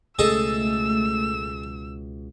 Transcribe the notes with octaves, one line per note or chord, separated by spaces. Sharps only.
C#2 B2 A3 G#4 A4 D#5 E6